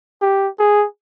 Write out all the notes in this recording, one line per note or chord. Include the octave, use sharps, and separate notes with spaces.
G4
G#4